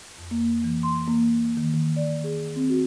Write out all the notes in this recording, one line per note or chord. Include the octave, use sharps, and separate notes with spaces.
F2
A#3
E3
C6
A#3
D#3
D#3
D5
G#4
C4
F#4